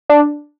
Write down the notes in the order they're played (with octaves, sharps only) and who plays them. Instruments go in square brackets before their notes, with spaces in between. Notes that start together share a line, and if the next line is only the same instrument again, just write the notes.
[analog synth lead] D4